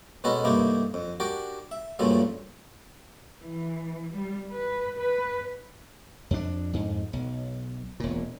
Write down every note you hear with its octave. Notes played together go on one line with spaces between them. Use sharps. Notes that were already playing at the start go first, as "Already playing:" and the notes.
B2 G#3 C#4 F#4 A4 B4
G2 C3 A3 A#3 D#4 E4
F2
D4 F#4 G4 A#4
E5
G2 A#2 C#3 F3 F#3 A3
E3
G3
B4
B4
F2 D4
F2 G#2
B1
E1 A#2